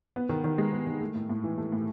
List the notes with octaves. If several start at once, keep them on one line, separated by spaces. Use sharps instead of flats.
B3
D#3
D#3
G#3
B3
D#3
A3
A2
A2
E3
A3
A2